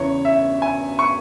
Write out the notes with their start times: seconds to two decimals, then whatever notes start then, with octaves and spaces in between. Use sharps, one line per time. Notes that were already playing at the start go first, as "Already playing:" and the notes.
Already playing: E2 C#3 E3 C#5
0.25 E5
0.62 G#5
0.99 C#6